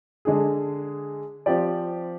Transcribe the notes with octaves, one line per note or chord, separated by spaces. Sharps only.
D3 G#3 D4 G#4
F3 C4 G4 D5